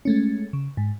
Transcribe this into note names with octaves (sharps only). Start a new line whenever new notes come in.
G#3 A3 C#4
C#3
G#2